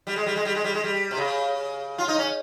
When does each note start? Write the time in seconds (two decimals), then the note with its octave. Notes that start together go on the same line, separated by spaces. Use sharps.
0.07 G3
0.16 G#3
0.26 G3
0.36 G#3
0.45 G3
0.55 G#3
0.64 G3
0.74 G#3
0.84 G3
1.11 C3
1.17 C#3
1.98 F4
2.08 D#4
2.18 C#4